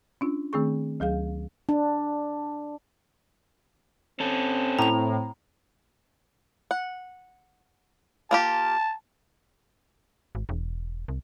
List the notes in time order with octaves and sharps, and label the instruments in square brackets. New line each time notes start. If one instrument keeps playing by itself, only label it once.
[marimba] C#4 D4 F4
D#3 A3 C4 G#4 C#6
D2 F#3 G#4 F5
[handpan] D4
[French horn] C4 [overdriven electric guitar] C#4 A4
[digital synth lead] A2 [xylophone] A#5 F7
[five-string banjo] F#5
[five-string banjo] A#3 F4 G4 [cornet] A5
[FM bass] G#1
E1
C2